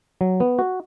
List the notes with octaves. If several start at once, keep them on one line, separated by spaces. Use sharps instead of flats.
F#3
B3
F#4